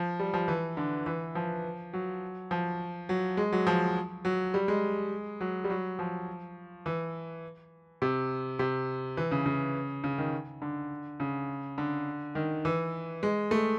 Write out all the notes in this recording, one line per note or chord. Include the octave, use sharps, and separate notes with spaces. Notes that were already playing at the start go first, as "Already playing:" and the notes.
Already playing: F3
G3
F3
E3
D3
E3
F3
F#3
F3
F#3
G#3
F#3
F3
F#3
G3
G#3
F#3
G3
F#3
F3
E3
C3
C3
E3
C#3
C#3
C#3
D#3
D3
C#3
D3
D#3
E3
G#3
A3